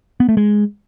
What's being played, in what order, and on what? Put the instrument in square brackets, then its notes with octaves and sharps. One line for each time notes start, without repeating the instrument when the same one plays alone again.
[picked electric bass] B3
A3
G#3